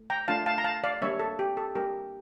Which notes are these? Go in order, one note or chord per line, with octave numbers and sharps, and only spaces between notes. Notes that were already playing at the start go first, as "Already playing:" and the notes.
Already playing: A3
G5 A#5
A3 D4 F4 F5 A5
F5 A5
A#5
F5 A5
D5 F5
G3 A#3 D4 C#5 E5
A4
G4
A4
G3 A#3 D4 G4 A#4